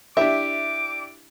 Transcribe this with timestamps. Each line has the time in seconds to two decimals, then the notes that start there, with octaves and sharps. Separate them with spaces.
0.17 D4 E4 G4 E5 D6